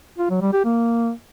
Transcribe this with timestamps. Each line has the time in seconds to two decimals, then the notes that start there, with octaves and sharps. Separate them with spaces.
0.18 F4
0.30 F#3
0.41 G3
0.53 G4
0.64 A#3